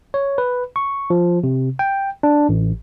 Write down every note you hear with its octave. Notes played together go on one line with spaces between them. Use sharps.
C#5
B4
C#6
F3
C3
G5
D4
A1